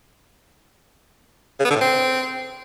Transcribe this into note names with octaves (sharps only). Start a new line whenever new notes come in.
C#3
B3
D3
A2
C4